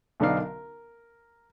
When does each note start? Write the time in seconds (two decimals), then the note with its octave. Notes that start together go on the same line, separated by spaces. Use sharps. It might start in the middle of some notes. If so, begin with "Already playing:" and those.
0.20 B1 D3 B3 D4 D#4 F5
0.37 A#4